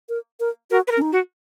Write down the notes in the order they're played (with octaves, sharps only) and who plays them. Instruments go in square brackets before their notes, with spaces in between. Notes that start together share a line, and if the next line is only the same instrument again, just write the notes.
[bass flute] A#4
A#4
[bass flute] F#4 [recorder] A#4
[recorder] B4
A#4
[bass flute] C#4
D#4
[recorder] F#4